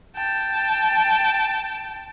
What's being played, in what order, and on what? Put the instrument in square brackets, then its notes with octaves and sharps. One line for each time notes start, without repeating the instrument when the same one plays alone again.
[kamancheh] G5 A5